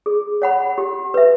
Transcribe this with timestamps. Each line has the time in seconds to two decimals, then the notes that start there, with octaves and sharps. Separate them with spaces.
0.06 G#4
0.42 C#5 F#5 B5
0.78 G4
1.14 B4 E5